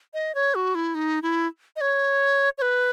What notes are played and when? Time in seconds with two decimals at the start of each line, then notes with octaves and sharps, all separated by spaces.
0.14 D#5
0.35 C#5
0.55 F#4
0.75 E4
0.95 D#4
1.23 E4
1.76 D#5
1.81 C#5
2.58 C#5
2.62 B4